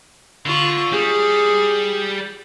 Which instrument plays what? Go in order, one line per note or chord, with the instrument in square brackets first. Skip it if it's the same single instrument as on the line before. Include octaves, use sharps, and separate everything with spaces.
[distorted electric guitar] D3 [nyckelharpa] F4 C#6
[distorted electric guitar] G3 [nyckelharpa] G#4